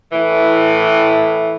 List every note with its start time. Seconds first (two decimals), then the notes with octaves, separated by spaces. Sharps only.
0.12 A2 E3